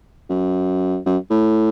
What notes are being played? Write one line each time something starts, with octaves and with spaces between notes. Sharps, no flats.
F#2
F#2
A2